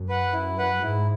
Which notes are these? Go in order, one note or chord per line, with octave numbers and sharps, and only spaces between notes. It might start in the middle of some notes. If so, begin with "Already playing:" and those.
Already playing: F#2
B4 F#5
F#2 E4
B4 F#5
G#2 E4